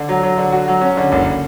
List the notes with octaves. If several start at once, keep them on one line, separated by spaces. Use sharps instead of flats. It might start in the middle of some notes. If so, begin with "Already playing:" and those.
Already playing: D3
F#3
F#3
D3
F#4
F#3
C#4
D3
F#1